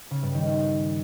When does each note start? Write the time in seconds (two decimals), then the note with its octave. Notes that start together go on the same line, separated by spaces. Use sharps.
0.11 C#3
0.22 G2
0.34 D#3